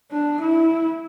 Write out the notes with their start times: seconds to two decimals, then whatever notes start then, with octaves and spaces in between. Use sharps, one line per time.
0.11 D4
0.41 E4